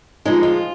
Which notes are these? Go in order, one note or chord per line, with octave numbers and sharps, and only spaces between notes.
D3 F3 G#3 D#4
F4